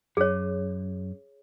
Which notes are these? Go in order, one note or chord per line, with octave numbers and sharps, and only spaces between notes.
F#2 G#4 C#5